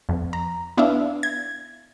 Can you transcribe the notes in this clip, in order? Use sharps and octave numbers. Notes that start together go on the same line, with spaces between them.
F2
A#5
B3 D4 E4 B4 E5 F5
G#6